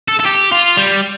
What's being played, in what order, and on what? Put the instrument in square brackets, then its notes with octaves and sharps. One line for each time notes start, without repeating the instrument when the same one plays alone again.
[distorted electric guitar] A4
A4
G4
F4
G3